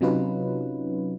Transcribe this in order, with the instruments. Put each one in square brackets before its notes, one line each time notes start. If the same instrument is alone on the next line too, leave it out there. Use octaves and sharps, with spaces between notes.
[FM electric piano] C3 F#3 C#4 D#4 F4 B4